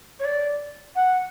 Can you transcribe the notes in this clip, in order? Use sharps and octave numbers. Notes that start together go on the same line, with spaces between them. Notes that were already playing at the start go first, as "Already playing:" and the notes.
C#5
D5
F#5